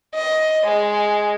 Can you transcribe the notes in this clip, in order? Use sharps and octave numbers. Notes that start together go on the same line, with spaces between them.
D#5
G#3